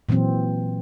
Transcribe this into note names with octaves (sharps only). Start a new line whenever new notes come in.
A#2 E3 F#3 C4